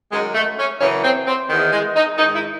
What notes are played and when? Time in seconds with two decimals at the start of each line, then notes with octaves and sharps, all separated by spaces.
0.11 F#2 D#3 G#3
0.34 A3
0.58 C#4
0.80 F#2 C#3 E3 C#4
1.03 C4
1.26 C4
1.49 E2 D#3
1.72 G#3
1.95 D#4
2.17 G#2 D#3 D#4
2.34 E4